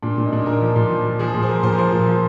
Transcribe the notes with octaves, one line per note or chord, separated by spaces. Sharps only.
A#2 D4
A#2
D#4
A#2 D4
A#2 A#4
F3
A#2
F3
F3
F3 G#4
A#2
C5
F3 A#4
A#2 C5
A#4
F3 C5
A#2
F3